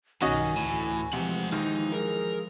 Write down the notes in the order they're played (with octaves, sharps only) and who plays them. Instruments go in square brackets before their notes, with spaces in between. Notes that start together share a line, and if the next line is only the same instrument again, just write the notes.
[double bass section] B1 G2 [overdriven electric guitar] D#3 [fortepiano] C#4 F#4 D#5 [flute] G#5
[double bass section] D2 E3 A3 [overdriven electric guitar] A2
[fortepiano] C3 [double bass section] E3 F3 G#3 [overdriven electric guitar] A3 F#5
[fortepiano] D#2 [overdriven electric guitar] D#4
[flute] G#4 [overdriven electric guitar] A#4